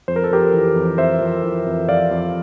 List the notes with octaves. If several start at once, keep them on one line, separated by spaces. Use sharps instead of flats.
F2 C5
A#4
A4
F2 G4 A#4
E3
F2
F2 C5 E5
F2
E3
F2
F2 D5 F5
F2